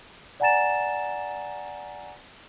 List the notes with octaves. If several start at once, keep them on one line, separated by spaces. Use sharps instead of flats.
D5 F#5 G#5 A#5 A6 E7